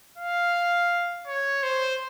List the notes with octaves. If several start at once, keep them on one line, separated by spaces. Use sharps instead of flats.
F5
C#5
C5